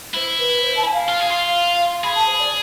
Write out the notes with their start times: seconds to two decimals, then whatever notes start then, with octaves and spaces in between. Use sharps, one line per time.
0.14 E4 C5
0.38 B4
0.61 C5
0.76 A5
0.85 G#5
0.93 F5
1.09 F4
1.20 G#4
1.30 F4
2.03 G#4 B5
2.15 A5
2.26 C5
2.38 D5